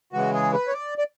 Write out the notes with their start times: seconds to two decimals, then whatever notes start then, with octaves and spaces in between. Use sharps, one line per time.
0.13 C#3 E3 G#3 F#4
0.33 G#4
0.53 B4
0.68 C#5
0.73 D5
0.98 D5